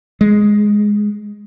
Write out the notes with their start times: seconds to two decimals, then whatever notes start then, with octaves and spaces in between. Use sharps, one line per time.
0.21 G#3